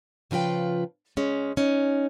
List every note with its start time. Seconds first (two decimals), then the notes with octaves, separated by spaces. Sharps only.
0.31 C#3 F3 F4 B4 G5
1.17 C#3 G#3 C#4
1.57 C#4 D#4